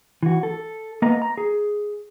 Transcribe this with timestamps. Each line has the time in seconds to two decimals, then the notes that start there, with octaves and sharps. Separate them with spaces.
0.23 E3 F#4
0.43 A4
1.02 A#3 B3 D#5 A#5
1.22 A#5
1.37 G#4